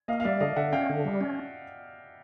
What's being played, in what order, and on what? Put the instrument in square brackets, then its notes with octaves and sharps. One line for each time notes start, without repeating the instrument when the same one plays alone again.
[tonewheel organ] A#3 [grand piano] D#5 F5
[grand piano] F5
[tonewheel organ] G3 [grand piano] D5 E5
[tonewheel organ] D3 [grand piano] D#5 F5
[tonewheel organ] D3 [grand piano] E5 F#5
[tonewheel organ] C#4 [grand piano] F5 G5
[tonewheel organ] D3
G3
C#4